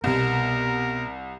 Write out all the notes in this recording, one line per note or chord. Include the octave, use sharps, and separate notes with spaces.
C2 B2 B3 A#4